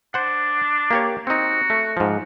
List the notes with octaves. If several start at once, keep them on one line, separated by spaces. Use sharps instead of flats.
D4 C5 F#5
A#3 G4 C#5
C4 D#4 F#4
A3
G#2 F3